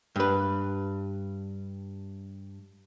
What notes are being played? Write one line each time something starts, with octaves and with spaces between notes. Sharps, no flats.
G2 B4